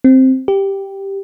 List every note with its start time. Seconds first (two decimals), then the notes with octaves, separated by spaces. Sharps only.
0.04 C4
0.48 G4